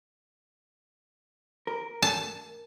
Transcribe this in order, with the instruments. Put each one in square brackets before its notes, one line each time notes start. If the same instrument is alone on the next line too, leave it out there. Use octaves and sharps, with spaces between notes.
[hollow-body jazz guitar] A#4
[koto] A5